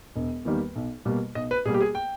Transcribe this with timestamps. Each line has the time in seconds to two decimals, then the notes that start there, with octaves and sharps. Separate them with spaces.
0.16 E1
0.45 E2 D#3 G3 A#3
0.76 B1
1.05 B2 G3 A#3
1.35 B1 D#5
1.51 B4
1.65 B2 G3 A#3 G#4
1.74 G4
1.81 G#4
1.95 G5